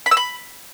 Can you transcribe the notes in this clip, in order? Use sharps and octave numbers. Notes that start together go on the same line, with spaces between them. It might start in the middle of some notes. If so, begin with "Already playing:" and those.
B5
E6
B5